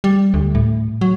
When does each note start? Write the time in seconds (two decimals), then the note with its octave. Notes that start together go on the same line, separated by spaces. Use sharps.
0.04 G3
0.34 D2
0.55 A2
1.01 F#3